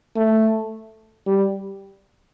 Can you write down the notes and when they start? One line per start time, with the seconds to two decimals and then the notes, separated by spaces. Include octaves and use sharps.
0.17 A3
1.27 G3